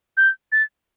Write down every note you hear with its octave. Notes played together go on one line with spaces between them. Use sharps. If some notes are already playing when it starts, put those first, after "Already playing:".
G6
A6